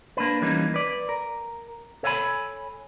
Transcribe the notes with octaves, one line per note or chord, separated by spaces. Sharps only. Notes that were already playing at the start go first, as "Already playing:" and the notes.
A#3 D4 B4
E3 G3 A#3 C#4 D#4
B4 D5
A#4
A4 C#5 D#5 F5 G#5 B5